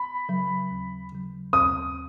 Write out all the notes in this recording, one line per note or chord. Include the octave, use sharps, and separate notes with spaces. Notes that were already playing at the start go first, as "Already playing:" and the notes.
Already playing: B5
C#3 F#3
D#2
C#3 F#3
D#2 D#6